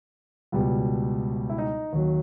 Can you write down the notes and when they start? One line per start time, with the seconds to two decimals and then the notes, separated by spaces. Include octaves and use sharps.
0.52 C#2 B2 G3
1.49 E4
1.58 D#4
1.93 D#2 D#3 F#3